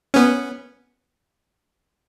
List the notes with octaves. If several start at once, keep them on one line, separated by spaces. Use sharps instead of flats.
B3 C#4